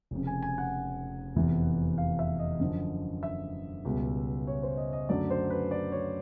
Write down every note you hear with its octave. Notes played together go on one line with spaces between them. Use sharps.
F1 F2 C#3
G#5
G#5
F#5
F1 E2 C3 E3
F5
E5
D#5
F#2 D3 F3
E5
C#2 B2 G3 B3
C#5
C5
D#5
D#5
F#2 D3 F#3 A3 D5
C5
B4
D5
C#5